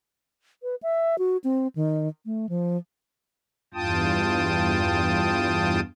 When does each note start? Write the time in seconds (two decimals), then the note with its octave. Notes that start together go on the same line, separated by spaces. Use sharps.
0.63 B4
0.83 E5
1.19 F#4
1.44 C4
1.76 D#3
2.26 A3
2.49 F3
3.74 E2 G2 F4 G5 A5 D#6